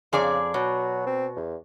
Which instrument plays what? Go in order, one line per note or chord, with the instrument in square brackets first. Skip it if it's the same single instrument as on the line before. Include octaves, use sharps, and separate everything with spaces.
[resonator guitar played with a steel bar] F2 G#4 D5 [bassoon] C#3
[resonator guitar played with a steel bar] B2 [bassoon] F#3
[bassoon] C4
E2